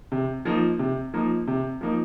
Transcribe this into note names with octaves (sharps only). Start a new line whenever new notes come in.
C3
F3 A#3 D#4
C3
F3 A#3 D#4
C3
F3 A#3 D#4